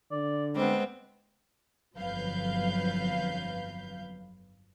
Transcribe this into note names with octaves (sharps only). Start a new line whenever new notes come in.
D3 D5
G3 G#3 B3 C4
G1 F2 F#3 B4 F5 G6